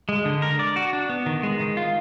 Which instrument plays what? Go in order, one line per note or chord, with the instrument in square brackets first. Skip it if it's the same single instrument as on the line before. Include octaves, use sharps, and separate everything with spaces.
[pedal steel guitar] G#3
D3
A#4
D5
F#4
D4
B3
D#3
G#3
D#3
F4